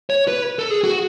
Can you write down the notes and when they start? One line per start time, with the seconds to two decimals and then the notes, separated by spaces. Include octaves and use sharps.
0.10 C#5
0.28 B4
0.59 A4
0.70 G#4
0.84 F#4